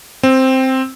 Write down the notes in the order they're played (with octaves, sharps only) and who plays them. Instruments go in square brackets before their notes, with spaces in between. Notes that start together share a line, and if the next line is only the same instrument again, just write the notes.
[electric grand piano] C4